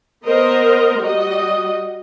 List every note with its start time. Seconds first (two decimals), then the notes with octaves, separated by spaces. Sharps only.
0.25 B3 A#4 C5 D#5 A#5
1.00 G3 F#4 D#5